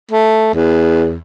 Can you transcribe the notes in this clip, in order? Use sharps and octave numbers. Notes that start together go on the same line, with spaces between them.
A3
E2